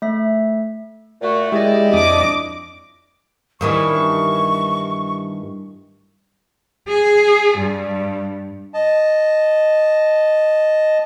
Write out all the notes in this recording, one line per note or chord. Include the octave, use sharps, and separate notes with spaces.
A3 E5
A#2 A3 F#4
G#3 E4 G4 D5 D#5
F2 D4 D6 D#6
G2 D#3 E3 C#6
G#4
G2
D#5 A5